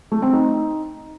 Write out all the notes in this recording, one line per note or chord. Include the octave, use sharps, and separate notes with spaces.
A3
C4
D#4